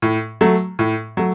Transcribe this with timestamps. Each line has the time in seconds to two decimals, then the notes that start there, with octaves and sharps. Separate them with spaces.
0.02 A2
0.41 F#3 A3
0.79 A2
1.17 F#3 A3